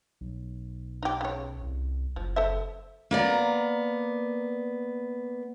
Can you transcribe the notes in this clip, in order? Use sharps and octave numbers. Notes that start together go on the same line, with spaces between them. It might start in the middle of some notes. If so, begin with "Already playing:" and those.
B1
D#4 G4
C#3 C#5
C2
F#1 F3
A4 C5 E5
A#3 B3 D5 A#5